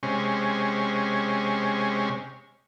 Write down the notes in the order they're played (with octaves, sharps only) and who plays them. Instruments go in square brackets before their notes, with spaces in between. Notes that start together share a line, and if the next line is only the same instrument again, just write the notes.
[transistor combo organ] C3 G#3 C#4